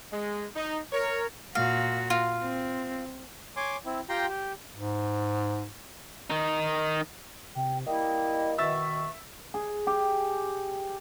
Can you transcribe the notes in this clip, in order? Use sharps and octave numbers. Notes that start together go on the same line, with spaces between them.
G#3
D#4
A#4 C#5
A#2 F#4 F5
F4
C4
C#5 G#5 C6 D6
C4 E4
F4 G4 G5 A#5 C6
G4
G#2
D#3 D#4
C3 G5
G3 A#3 E4 D#5 G5
B2 D#3 E5 C#6 E6 A6
G#4
G4